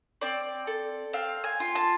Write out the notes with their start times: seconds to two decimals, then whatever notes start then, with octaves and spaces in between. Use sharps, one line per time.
0.21 C4 D5
0.67 A4
1.13 C4 F5
1.44 G#5
1.60 F4
1.75 A5